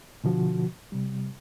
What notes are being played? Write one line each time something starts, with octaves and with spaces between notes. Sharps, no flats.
B2 D3 F3 F#4
C3 G3